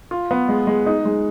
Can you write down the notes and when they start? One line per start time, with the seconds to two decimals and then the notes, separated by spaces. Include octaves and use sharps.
0.11 F4
0.31 B3
0.49 G#3
0.67 G#3
0.86 D#4
1.05 G#3